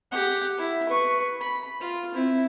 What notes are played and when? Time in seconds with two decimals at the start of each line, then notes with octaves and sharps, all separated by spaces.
0.12 G4 F#5
0.58 E4
0.89 B4 C#6
1.41 B5
1.81 F4
2.14 C4 E4